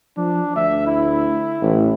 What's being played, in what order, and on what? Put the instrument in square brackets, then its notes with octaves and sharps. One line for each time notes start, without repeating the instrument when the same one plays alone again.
[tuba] F3 [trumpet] D4
[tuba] D2 [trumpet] E5
[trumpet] E4
[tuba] A1